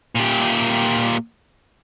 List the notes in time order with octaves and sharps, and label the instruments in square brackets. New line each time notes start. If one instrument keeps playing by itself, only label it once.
[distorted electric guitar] A#2 G4